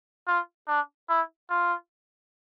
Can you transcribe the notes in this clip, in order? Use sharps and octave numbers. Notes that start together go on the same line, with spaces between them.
F4
D4
E4
F4